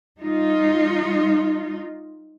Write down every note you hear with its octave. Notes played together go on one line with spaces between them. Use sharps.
G3 D#4 F4